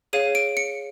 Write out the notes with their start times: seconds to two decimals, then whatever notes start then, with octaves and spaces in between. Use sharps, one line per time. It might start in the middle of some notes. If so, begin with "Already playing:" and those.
0.13 G#4 C#5 F5 D#7
0.35 D7
0.57 C#7